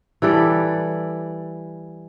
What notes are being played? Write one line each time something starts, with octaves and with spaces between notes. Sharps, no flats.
E3 G3 A4 D5